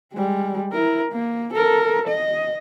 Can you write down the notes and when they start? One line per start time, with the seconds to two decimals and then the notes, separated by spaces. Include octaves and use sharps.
0.12 G3 G#3
0.72 E4 A#4
1.12 A#3
1.53 A4 A#4
2.08 D#5